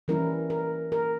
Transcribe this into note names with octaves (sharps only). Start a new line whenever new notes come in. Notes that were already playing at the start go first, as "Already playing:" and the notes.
E3 G3 C#4 E4 A#4
A#4
A#4